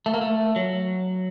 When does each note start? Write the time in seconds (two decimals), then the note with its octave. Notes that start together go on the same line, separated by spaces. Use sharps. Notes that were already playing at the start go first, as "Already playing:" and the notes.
0.06 A3
0.14 A#3
0.21 A3
0.56 F#3